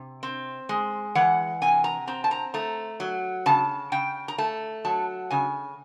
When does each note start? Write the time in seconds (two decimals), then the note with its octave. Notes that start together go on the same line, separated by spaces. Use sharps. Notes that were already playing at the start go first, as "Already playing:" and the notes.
Already playing: C3
0.23 C4
0.69 G#3
1.15 E3 F#5
1.62 C3 G#5
1.84 A#5
2.07 C4 A#5
2.24 A5
2.31 A#5
2.54 A3 A#5
3.00 F#3
3.46 C#3 A5
3.92 C#3 G5
4.28 A#5
4.38 A3 A5
4.85 F#3 A5
5.30 C#3 G#5